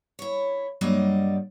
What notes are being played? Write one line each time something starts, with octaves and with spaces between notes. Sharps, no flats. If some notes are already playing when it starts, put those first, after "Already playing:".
E4 C#5
G2 F#3 G3 A#3 D5 D#5